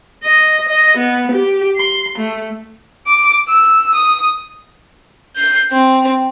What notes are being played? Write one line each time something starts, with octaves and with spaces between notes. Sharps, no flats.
D#5
D#5
B3
G4
C6
A3
D6
E6
D#6
G6 C7
C4